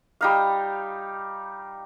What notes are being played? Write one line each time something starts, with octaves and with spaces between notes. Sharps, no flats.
G3 D#4 F5